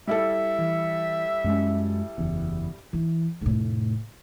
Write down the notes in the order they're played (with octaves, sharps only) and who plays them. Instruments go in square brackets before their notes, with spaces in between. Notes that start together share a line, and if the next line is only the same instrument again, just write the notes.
[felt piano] G3 E4 A4 [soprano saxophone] E5
[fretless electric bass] E3
F#2 G#3 C#4
F#1 E2
[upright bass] E3
F1 A2